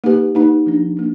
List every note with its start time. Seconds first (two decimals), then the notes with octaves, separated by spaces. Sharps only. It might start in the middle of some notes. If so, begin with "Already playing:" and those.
0.04 A#3 D#4 G4 B4
0.35 A#3 D#4 G4 B4
0.66 F3 A#3 D4
0.97 A#3 D4